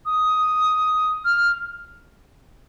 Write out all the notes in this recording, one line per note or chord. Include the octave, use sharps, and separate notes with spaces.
D#6
F6